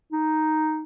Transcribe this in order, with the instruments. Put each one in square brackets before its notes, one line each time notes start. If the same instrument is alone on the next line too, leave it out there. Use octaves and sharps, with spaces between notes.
[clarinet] D#4